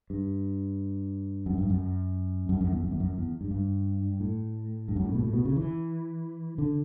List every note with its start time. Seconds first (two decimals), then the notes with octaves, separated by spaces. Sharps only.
0.10 G2
1.46 F#2
1.58 G2
1.70 F#2
2.49 F#2
2.61 F#2
2.72 E2
2.84 F#2
2.91 E2
3.00 F#2
3.18 E2
3.41 G2
3.51 G2
4.20 A2
4.88 G2
4.96 F#2
5.05 A2
5.14 B2
5.23 A2
5.33 B2
5.45 C#3
5.56 E3
6.58 D3